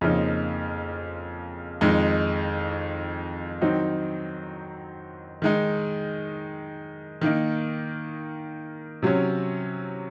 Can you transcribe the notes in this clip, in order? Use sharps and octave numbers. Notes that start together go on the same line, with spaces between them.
F2 C#3 F3 A#3 D#4
F2 D#3 G#3 D#4
D#3 F#3 C4 D#4
D#3 G#3 D#4
D#3 A#3 D#4
C3 F#3 C#4